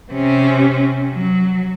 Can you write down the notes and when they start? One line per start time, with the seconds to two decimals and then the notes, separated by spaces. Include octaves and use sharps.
0.12 C3 C#4
1.14 F#3